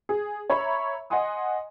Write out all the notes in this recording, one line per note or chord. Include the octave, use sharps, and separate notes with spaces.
G#4
C#5 E5 A#5 B5
D#5 F#5 G#5 C6 D#6